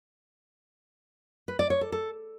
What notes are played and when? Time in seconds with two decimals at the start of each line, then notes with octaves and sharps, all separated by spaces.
1.48 B4
1.59 D5
1.70 C#5
1.81 A4
1.92 A4